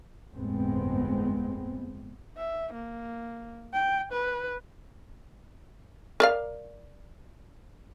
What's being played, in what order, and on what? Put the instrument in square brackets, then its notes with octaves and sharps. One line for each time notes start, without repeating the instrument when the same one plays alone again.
[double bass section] G1 F2 A2 G#3 B3 C4
[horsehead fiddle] E5
A#3
G5
B4
[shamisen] A#4 D5 F5